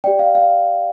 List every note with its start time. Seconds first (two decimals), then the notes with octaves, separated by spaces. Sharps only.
0.04 G4 D5 G5
0.19 F5
0.35 F5